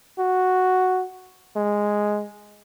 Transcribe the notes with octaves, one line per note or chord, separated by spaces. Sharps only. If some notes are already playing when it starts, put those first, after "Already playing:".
F#4
G#3